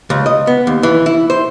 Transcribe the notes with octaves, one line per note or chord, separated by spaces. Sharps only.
C#2
D#5
B3
D#2
E3
E4
C5